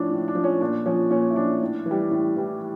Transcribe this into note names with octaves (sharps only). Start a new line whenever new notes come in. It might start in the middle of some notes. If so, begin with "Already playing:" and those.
Already playing: A2 F3 C#4 D4
A2
D4
F3
C#4
A#2 D4
F3 C#4
A#2 C#4
E4
F3 D4
A2
E3
G3
A2
E3 G3